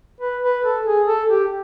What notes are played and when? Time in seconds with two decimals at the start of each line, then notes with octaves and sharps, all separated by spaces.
0.21 B4
0.42 B4
0.64 A4
0.86 G#4
1.07 A4
1.29 G4